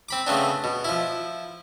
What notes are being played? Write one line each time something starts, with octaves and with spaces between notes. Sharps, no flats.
C4 B5 D6
C#3 A3 B3 C4 D4
B2
F3 E4